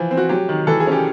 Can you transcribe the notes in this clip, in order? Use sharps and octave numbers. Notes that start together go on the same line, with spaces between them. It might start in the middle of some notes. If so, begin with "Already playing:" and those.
Already playing: E3 F3
C4
F#4
F#3 G4
D#3
E3 A4
G#4
C#4 G4